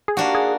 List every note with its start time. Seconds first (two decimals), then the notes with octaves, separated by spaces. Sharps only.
0.08 G#4
0.17 A#3 D4 F#4 G4
0.35 G#4